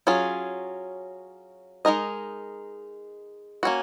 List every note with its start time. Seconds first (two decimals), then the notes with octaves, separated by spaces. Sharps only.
0.07 F#3 C#4 F4 G#4
1.85 G#3 D#4 A#4 D#5
3.63 A#3 C#4 F#4